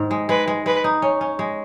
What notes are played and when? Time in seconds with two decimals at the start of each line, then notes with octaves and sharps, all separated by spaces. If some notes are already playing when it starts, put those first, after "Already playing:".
Already playing: G#2 D#3
0.11 G#3
0.29 G#3 B4
0.48 G#3
0.66 G#3 B4
0.84 D#4
1.02 C#4
1.21 C#4
1.39 G#3